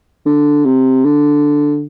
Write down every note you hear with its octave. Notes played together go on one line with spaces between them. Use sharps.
D3
C3
D3